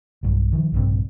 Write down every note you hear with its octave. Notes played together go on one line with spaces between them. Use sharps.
B1 G2
D#3 F3
A#1 G2 C3